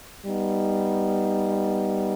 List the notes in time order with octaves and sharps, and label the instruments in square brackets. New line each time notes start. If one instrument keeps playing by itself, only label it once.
[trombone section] G3 B3 D#4